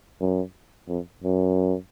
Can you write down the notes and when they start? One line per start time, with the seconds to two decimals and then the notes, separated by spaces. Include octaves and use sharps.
0.21 F#2
0.88 F2
1.24 F#2